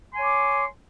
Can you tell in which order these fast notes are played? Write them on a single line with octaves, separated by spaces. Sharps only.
C6 G#5 C#5 D6